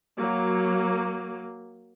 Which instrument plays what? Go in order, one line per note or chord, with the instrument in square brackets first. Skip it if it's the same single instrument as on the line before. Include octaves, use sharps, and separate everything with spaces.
[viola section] F#3 A#3